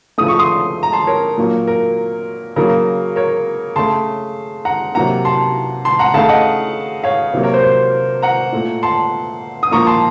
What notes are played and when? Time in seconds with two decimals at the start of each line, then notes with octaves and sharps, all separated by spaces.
0.18 C#3 F3 A3 D#6
0.28 C#6
0.39 C6 D#6
0.83 A#5
0.93 A5 C6
1.07 A#4 C#5
1.38 A#2 F#3 A#3
1.67 A#4
2.56 C#3 F#3 A#3 A#4
3.16 A#4 C#5
3.76 C#3 A3 A5 C6
4.65 F#5 A#5
4.95 C3 F#3 A#3 F#5 A#5
5.25 A5 C6
5.85 A5 C6
5.99 F#5 A#5
6.14 C#3 A3 F5 A5
6.29 D#5 F#5
7.04 C#5 F5
7.34 C3 F#3 A#3
7.43 A#4 C#5
7.54 C5
7.64 C5
8.22 F#5 A#5
8.52 A#2 A3
8.83 A5 C6
9.63 D#6
9.71 A#2 F3 A#3 A#5 C#6
9.87 A5 C6